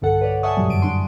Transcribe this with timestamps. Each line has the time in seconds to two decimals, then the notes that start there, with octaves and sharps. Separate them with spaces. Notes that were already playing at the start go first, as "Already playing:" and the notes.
0.02 B1 G2 D3 A4 F#5
0.21 B4 C#5 D5
0.43 E5 F#5 G#5 A5 C#6 D#6
0.57 G2 A#2 E3 F#3 G3
0.69 F#2 D3 D7 D#7
0.82 D4 C6